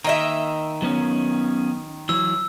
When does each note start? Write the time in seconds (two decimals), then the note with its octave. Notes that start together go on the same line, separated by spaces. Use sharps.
0.04 D#3 A#3 D#5 E5
0.82 F#3 B3 C#4
2.09 E3 F#3 E6